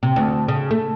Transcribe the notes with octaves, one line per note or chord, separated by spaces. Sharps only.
C3
D2
C#3
A3